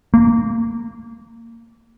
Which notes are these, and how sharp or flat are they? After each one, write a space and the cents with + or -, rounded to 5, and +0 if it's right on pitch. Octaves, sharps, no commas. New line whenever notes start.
A#3 -20